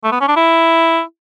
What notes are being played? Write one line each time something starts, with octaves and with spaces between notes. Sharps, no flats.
A3
B3
C#4
D4
E4